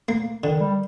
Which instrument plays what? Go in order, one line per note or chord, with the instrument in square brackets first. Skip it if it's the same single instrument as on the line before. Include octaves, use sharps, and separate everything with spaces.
[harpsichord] A#3
[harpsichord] D3 [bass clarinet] D#3
[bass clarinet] G3